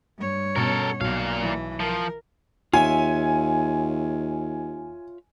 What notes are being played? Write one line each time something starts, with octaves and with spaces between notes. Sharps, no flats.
G2 C#5
B2 B3 C#4 A4 A#4
B1 A#2 F5
E3
F3 A#4
D#2 F4 C#5 E5 G#5